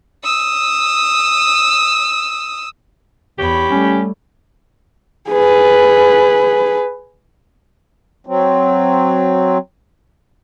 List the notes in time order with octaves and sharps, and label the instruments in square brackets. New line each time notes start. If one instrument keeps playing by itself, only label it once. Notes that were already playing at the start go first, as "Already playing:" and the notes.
[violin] D#6 E6
[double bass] E2 [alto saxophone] G4 [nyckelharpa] C#5 B5
[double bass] G3 A3 [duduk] C#4
[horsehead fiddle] G#4 B4
[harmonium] F#3 C4